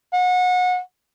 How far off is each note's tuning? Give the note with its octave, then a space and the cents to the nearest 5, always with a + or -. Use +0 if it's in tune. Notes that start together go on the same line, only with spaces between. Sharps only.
F#5 -30